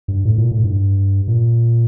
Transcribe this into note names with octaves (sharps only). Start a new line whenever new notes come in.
G2
A2
A#2
A2
G2
A#2